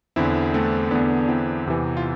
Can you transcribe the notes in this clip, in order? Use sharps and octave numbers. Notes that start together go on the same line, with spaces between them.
E2 D3 C4 E4
A3 C4
E2 D3 B3 D4
C4 E4
E2 C3 E3
F4